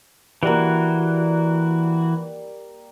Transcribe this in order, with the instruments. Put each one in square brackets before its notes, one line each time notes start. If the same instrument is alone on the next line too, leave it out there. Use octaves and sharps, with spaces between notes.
[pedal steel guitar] E3 F#4 [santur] G3 A#3